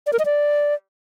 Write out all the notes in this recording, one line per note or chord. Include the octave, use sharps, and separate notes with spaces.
D5
A#4
D#5
D5